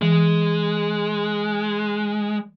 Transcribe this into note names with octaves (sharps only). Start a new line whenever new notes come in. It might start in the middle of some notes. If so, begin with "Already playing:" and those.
E3 G#3